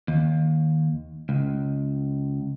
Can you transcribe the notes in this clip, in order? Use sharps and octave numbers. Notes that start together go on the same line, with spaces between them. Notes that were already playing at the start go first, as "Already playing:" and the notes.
D#2
C#2